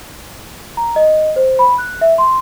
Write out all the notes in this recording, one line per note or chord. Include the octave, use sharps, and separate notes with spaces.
A#5
D#5
C5
B5
F#6
E5
C6